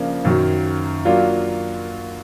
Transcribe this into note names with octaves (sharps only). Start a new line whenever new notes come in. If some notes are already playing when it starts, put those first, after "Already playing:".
Already playing: C#3 F3 A#3 D4
F#2 D#3 F#3
F#3 A#3 D4 F4